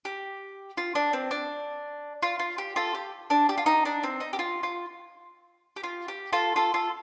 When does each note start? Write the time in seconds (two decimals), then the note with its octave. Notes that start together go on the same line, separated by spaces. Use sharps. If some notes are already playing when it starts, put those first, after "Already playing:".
0.05 G4
0.77 F4
0.95 D4
1.13 C4
1.31 D4
2.22 F4
2.39 F4
2.58 G4
2.76 F4 A4
2.95 G4
3.30 D4
3.49 G4
3.58 F4
3.66 D#4
3.85 D4
4.03 C4
4.20 D#4
4.33 G4
4.39 F4
4.63 F4
5.76 G4
5.83 F4
6.08 G4
6.33 F4 A4
6.56 F4 A4
6.74 F4 A4